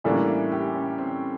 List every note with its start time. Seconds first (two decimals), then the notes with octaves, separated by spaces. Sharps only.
0.04 A2 E3 G3 A#3 C#4 D4
0.28 E4
0.52 G4
0.75 C#4
0.98 C4